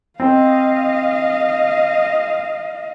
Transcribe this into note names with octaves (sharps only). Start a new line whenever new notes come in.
C4 D#5 F5